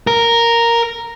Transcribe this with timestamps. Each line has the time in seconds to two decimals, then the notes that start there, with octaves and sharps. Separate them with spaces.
0.07 A#4